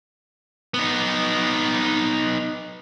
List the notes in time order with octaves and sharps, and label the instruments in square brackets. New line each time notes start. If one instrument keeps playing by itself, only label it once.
[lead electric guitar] B3 D#4